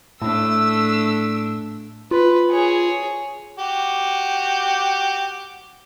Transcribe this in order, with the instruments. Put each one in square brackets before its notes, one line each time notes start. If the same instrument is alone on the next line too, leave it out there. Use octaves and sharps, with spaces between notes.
[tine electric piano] A2 [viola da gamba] A3 D4 [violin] E6
[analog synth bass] F4 [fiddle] B4
[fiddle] G#4 C#5
[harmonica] F#4 G4